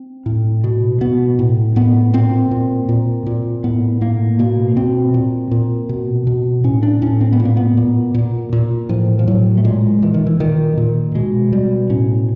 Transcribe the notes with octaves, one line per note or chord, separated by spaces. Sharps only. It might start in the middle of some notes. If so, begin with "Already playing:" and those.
Already playing: C4
A2
B2
B2 B3
A2
A2 B3
A#2 C4
A#2
A#2
A#2
A2 B3
A2 A#3
B2 A#3
B2 C4
A#2
A#2
B2
B2
A2 C#4
D4
A2 C#4
C4
B3
A#2
A#3
B3
A#2
A#2
A#2
A2 F3
F3
A2 F#3
A3
A#2 G#3
A#2 E3
D#3
E3
A#2 D#3
A#2 D#3
B2 G#3
B2 G3
A2 C#4